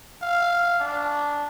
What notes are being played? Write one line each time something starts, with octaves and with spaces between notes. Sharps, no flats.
F5
D4